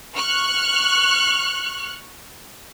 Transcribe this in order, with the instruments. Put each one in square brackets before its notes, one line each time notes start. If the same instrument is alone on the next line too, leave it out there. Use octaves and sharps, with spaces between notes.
[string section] C#6 F6 F#6